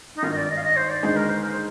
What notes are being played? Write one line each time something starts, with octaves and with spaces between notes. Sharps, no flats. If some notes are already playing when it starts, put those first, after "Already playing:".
D#4
G#1 G2 D#3 F4
D#5
D5
D#5
F5
D#5
C5
D5
D#2 D3 G#3 D#4 C5
A#4
C5
A#4
C5